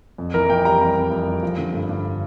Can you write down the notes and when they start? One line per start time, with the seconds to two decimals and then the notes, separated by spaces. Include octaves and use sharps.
0.18 F2
0.34 E3 A#4
0.50 F2 G5
0.65 G3 A#5
0.80 F2 A#5
0.96 F2
1.11 F2
1.27 G3
1.43 F3
1.58 D3
1.74 G2
1.89 G2